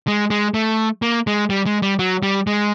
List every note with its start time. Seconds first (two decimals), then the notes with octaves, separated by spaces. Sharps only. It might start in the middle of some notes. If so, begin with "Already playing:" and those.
0.07 G#3
0.30 G#3
0.54 A3
1.02 A#3
1.27 G#3
1.50 G3
1.66 G#3
1.82 G3
1.99 F#3
2.23 G3
2.47 G#3